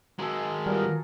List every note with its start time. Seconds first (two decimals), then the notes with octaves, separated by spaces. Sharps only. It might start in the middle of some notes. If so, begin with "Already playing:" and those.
0.18 D#3 F#3 G#3 G#4 A4
0.66 G3 B3 F4 A#4